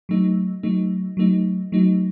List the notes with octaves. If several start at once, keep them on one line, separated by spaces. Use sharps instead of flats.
F#3 A3 D#4
F#3 A3 D#4
F#3 A3 D#4
F#3 A3 D#4